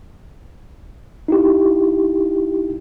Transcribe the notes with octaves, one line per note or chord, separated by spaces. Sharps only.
D#4 E4 G4